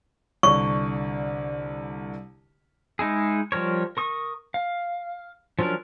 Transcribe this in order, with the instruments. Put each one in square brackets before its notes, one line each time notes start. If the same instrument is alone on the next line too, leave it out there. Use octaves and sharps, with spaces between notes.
[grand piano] C2 D3 [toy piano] C#6
[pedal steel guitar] G#3 D#4 E4 G#4
F3 G3 A#4 C#5
A#4 C#6 D#6
F5
F3 F#3 C#4 D4 A#4